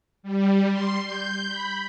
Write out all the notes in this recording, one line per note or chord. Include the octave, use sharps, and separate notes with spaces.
G3
C6
G6
B5